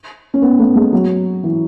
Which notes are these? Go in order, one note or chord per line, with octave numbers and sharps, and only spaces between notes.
C#4
B3
A3
G#3
F#3
E3